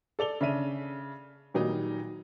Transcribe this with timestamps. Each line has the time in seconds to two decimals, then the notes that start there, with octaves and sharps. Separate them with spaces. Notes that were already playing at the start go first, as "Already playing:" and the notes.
0.19 A4 D5 F7 G7
0.41 C#3 D4 E5 D#7
1.54 A#2 D#3 F#3 G3 D#4